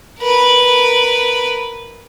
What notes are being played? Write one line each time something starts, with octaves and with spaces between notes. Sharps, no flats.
A#4 B4